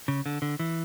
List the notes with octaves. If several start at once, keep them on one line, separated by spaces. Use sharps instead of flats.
C#3
D3
D3
E3